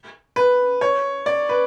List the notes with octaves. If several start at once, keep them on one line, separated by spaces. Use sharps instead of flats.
B4
C#5
D5
B4